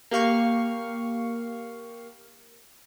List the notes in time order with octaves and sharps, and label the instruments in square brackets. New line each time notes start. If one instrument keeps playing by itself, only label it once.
[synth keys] A#3 G4 F5 C#6 C7